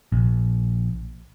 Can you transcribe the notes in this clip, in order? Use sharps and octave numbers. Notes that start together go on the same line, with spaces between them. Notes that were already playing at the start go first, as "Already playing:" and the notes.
A#1